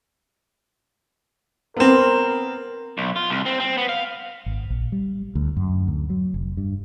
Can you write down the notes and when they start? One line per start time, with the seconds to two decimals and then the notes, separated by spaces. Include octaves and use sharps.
1.77 B3 C4 A#4
2.98 B1
3.16 F4
3.30 C2
3.46 C4
3.60 C4
3.78 B3
3.89 F5
4.46 G#1
4.70 A#1
4.92 G3
5.35 D2
5.57 F#2
5.87 D2
6.10 F#3
6.34 F1
6.57 G2